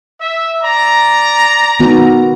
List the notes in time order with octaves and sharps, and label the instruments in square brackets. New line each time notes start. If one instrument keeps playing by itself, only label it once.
[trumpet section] E5
D5 A#5
[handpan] D#3 B3 F#4